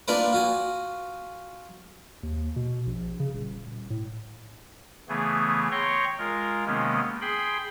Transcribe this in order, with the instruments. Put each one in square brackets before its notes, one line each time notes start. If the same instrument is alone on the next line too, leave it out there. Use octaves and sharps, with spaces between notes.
[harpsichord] A#3 D4 F4 A#4 B4
F4 F#4 G#5
[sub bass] D#2
B2
A#1
C#3
D#1
D#1
A2
[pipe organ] C#3 E3 A3 B3 G#4
C#5 G5 A#5 C6 C#6
G#3 F4 A#4
C3 D#3 G#3 A#3 B3 C#4
G#4 G5 B5 C6